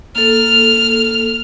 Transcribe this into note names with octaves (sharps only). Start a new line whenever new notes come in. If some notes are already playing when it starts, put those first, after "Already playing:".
A#3 A4 F6